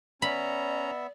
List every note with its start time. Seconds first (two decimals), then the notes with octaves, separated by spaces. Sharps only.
0.22 B3 C#4 D5 E5 A#5 B5